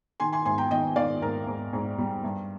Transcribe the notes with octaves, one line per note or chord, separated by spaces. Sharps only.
D#3 G#5 C6
G#5 C6
G#2 G#5 C6
G5 A#5
D#3 D#5 G5
D#3 D5 F5
G#2 A#4
G#2
G#2
G3
G2